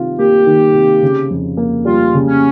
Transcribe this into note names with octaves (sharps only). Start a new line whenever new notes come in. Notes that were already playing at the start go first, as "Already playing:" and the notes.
Already playing: C3 D#3 F4
A#3 G4
D#3
C3
C#3
F2
A#3
G3 F4
C#3
C#4